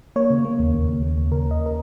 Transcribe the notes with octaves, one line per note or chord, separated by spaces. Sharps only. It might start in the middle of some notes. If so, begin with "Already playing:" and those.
A#3 C#5
C#3
A#3
D#2
D#2
C#3
A#3
D#2
C#3 A#4
D#2 D#5
A#4